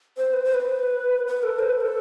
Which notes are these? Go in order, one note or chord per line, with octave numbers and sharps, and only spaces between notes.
C5
B4
C5
B4
B4
A4
C5
B4
A4